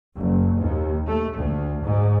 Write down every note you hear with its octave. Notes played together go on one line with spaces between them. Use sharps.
F#1
D#2
A3
D2
G#2